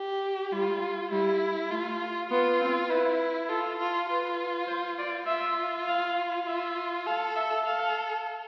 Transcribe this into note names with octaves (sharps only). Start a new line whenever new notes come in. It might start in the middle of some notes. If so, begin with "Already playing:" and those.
Already playing: G4
G3 F4
G3 E4
A3 F4
B3 F4
C4
E4 B4
F4 A4
F4
F4 B4
C5
D5
F4 E5
F5
F4 E5
A4 F5
E5
A4 F5